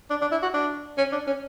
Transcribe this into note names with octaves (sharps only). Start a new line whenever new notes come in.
D4
D4
E4
F#4
D4
C#4
D4
C#4